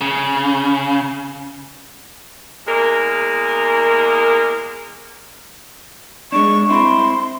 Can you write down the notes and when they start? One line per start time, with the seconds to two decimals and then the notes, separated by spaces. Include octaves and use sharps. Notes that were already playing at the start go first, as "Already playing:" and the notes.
0.01 C#3
2.67 E2 G#3 A#3 A#4
6.32 G#3 D4 C#6
6.70 C4 E4 C6